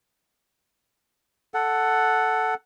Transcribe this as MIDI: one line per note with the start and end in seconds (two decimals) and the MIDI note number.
1.54 2.54 69
1.54 2.54 78